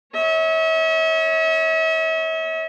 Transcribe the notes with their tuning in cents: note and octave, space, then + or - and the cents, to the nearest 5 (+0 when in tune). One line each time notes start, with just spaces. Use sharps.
C#5 +0 E5 -40